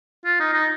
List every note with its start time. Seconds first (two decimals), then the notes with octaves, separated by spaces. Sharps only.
0.25 F4
0.40 D#4
0.53 D#4